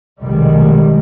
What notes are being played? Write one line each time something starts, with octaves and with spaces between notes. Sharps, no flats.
F1 B1 A2 D#3 G3 G#3